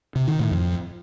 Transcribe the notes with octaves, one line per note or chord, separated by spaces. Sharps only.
C3
D#3
A2
F2